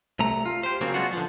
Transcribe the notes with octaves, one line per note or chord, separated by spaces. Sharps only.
C2 A3 A#5
F4
G4 C5
C#3 F#3 A#3 C4
G#3 B3 D4 F4 F#4
D3 F3